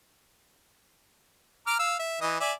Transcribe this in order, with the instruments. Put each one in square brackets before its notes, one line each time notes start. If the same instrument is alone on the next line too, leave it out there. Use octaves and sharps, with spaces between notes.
[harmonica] A#5 D6 F6
F5 E6
E5
E3 D#5
D5 E5 G#5